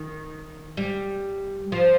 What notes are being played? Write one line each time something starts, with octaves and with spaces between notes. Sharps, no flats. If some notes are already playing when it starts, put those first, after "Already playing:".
Already playing: D#3
G3
F3